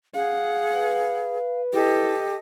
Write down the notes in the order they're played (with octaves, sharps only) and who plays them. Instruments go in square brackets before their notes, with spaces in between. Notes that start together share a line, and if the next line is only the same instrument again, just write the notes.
[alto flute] G#4 [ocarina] F5 [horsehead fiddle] F#5
[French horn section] B4
[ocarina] E4 [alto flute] G4 [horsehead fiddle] A4 D#5